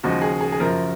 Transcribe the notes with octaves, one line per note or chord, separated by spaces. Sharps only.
D#2 C#3 F3 G#3 F#4
G#4
G#4
G#4
F#1 F#2 F3 A#4